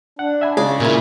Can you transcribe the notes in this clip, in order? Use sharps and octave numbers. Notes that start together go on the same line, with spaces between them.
D4 F#5
E5 G#5 B5
C#3 G#3 G#4 D5
A#2 E4 F#4 A#4 G#5